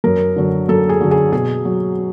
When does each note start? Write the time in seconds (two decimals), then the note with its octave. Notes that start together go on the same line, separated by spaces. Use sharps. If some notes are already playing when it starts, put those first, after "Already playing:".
0.04 F#2 A#4
0.36 D3 F#3
0.68 F#2 A4
0.89 G#4
1.01 D3 F#3
1.11 G#4
1.33 B2 G#4
1.65 F#3